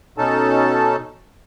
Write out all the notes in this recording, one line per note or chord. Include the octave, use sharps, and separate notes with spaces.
B2 C#4 D#4 A4 A5